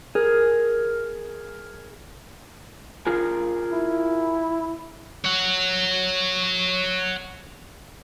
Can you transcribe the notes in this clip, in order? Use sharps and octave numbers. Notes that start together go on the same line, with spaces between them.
G#4 A#4
F4 G#4 A#4
E4
C#5 F#5